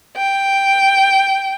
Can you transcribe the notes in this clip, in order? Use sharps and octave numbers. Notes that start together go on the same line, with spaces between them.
G5